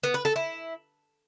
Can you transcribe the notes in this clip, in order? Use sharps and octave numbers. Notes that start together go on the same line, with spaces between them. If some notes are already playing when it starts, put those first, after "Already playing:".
B3
B4
A4
E4